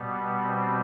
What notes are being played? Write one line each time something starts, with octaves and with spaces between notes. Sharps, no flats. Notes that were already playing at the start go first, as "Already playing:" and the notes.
Already playing: B2 G3 B3
C4